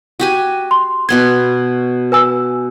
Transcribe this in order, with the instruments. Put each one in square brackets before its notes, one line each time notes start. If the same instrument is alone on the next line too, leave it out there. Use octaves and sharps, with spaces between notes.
[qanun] F#4 G4 G#5
[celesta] C6
[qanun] B2 B3 C6 [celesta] G#6
[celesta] B4 G#5 E6